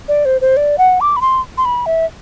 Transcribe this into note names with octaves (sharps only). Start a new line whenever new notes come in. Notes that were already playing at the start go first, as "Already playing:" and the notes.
D5
C5
C5
D5
F#5
D6
B5
C6
C6
B5
E5